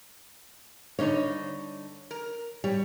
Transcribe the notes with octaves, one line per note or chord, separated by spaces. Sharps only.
G2 D3 D#4 C#5
A#4
G3 C#5